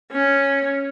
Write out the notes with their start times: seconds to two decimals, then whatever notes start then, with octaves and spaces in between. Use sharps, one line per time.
0.12 C#4